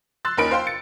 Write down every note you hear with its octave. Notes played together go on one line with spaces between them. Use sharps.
C6 E6 F#6 A6
D#2 C#4 D#4 A#4 B5 D7
C5 F5 G5 C6
A6 C#7